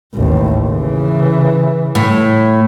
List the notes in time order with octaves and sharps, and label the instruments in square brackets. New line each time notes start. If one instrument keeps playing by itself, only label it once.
[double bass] A1 D#2
C#3 E3
[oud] A2